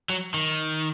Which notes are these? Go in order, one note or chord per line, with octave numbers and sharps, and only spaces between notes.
F#3
D#3